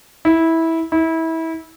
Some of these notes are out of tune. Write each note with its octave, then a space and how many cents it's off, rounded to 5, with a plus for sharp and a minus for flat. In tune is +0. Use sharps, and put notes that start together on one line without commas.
E4 -15
E4 -25